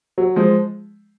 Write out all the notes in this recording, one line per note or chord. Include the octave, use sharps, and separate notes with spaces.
F#3
F3 G#3